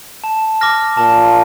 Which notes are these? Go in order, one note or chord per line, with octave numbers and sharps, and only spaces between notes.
A5
D6 F6 A#6
A#2 A5